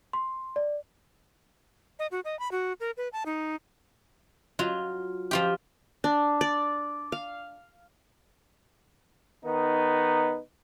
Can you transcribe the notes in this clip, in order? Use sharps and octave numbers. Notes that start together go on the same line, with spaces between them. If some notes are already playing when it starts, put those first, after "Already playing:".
C6
D5
D#5
F#4
D#5
B5
F#4
A#4
B4
A5
D#4
F#3 F4
F3 F4 G4
D4
D5
F5
D#3 B3 D#4